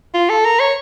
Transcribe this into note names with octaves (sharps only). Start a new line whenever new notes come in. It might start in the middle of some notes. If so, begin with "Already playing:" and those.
F4
A4
A#4
C#5